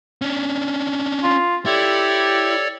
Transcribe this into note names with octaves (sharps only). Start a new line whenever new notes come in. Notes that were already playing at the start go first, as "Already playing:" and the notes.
C#4 D4
F4
E4 G4 A4 C#5 D5